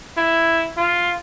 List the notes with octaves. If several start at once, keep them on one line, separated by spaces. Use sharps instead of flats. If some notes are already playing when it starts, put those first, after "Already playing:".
E4
F4